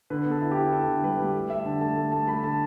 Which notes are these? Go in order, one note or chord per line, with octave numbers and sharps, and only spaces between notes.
D3 B4
B3
A4
E4
G4
E4
E4 A4
D3
G3 B4
G3
A3
A3 E5
D3 A5
A3 A5
A3
A3 A5
A3 B5
D3 A5